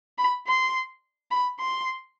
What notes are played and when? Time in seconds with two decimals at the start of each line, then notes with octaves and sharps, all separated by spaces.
0.18 B5
0.47 C6
1.31 B5
1.59 C6